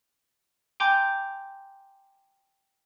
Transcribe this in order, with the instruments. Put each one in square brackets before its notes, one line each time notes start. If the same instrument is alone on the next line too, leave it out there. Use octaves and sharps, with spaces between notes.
[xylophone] G5 G#5 A#5 C6 D6 G6